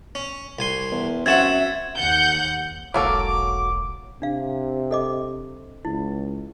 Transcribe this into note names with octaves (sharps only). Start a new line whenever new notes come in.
C#4
C2 G#5 C6
E2
F#2 C4 F#4 E5 F#5 G#6 A6 E7
D#2 F#5 G6
E1 B1 F#3 A#3 A4 D6
C3 D4 F5
A4 D#5 D6
C#2 E4